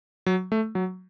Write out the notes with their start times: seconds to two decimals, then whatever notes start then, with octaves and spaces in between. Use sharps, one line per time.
0.26 F#3
0.52 A3
0.75 F#3